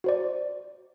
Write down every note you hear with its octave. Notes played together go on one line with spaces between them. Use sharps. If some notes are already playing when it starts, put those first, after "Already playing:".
F#4 C5 D5